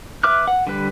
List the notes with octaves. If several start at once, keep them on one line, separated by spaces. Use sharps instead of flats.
B4 E5 D6 F6 F#6
F#5
D3 G3 B4